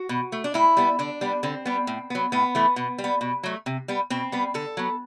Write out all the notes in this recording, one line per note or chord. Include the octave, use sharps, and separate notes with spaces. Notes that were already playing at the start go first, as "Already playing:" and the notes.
Already playing: F#4
B2
A3
D4
A2 E4
G3 B3
D3 D4
G3 B3
D3 C4
G3 B3
A2
F#3 B3
A2 B3
E3 A3
B2
G3
B3
B2
F#3 A3
C3
G3 B3
B2 C4
G3 B3
D3 A4
F#3 B3